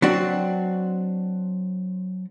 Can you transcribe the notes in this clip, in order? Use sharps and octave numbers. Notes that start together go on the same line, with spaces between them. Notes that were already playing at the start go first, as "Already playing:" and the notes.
F#3 C4 D4 F#4